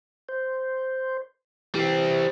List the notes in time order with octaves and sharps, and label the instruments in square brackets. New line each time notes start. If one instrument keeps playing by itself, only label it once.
[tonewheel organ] C5
[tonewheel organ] E3 [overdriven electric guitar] G3 C4